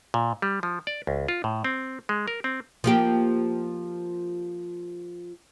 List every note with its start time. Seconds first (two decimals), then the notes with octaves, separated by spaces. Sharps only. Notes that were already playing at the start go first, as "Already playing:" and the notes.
0.14 A#2
0.42 G3
0.63 F3
0.87 D5
1.07 C#2
1.28 F4
1.44 A2
1.64 C4
2.09 G#3
2.28 A#4
2.44 C4
2.84 F3 A#3 G4